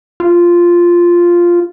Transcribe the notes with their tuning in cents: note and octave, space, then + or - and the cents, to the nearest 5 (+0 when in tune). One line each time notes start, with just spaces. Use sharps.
F4 -5